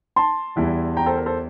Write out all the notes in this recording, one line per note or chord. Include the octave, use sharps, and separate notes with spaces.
A5 C6
E2 E3 G3
G5 A#5
A4 C5
A#4
A4 C5